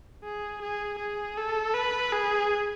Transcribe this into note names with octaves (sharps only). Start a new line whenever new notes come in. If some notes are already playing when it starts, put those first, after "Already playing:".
G#4
G#4
G#4
A4
B4
G#4